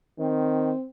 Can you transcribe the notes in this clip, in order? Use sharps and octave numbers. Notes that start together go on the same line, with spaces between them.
D#3 C4